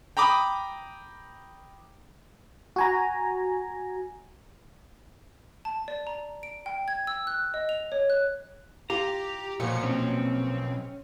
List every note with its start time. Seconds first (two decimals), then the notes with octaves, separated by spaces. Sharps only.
0.17 G5 A#5 B5 D6 D#6
2.76 F#4 G#5 A#5
5.65 A5
5.88 D5
6.07 A#5
6.43 D7
6.66 G5
6.88 G#6
7.07 E6
7.27 F#6
7.54 D#5
7.69 F7
7.92 C#5
8.10 F#6
8.90 F4 G4 A#5
9.60 B1 A#2 F3 F#4 C#7
9.84 C4 C#4